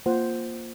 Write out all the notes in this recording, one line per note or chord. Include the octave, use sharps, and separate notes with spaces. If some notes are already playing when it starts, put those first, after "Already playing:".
A#3 F4 C5 F#5